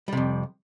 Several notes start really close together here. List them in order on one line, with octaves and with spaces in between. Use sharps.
G3 C3 F2